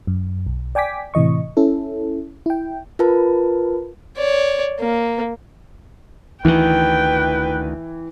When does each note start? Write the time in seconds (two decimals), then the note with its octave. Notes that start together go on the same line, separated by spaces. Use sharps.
0.07 F#2
0.46 B1
0.75 D5 G5 G#5 D6 B6
1.14 A2 C3 E3 D#5 C#6
1.57 C#4 E4 A4
2.46 E4 G5
2.99 F4 A#4 B4 A5
4.17 C#5 D5
4.80 A#3
6.45 D2 D#3 E3 B4 G5